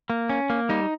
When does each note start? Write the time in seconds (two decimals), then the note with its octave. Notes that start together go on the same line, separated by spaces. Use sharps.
0.10 A#3
0.29 C#4
0.50 A#3
0.69 G3 D#4